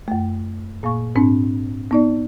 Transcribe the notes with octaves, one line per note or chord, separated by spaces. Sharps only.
F#2 A3
A#2 A#3 F5 C#6
G#2 C4 D4
B3 D#4 D5